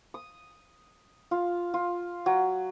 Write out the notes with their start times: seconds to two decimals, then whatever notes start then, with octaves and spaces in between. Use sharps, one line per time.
0.14 D#6
1.31 F4
1.74 F4
2.26 F#3